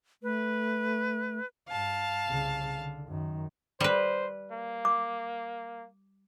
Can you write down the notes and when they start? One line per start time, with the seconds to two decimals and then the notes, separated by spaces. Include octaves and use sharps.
0.23 A3 B4
1.68 G2 F5 A5
2.26 C2 C#3
2.77 D3
3.09 F#2 D#3
3.81 G3 B4 C5
4.52 A#3
4.85 D6